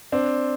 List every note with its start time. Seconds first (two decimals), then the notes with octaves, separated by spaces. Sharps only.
0.12 C4 D4